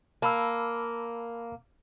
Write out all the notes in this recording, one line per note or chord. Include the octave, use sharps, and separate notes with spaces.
A#3 A5 B5 E6